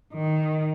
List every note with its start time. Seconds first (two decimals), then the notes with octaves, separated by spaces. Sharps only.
0.14 D#3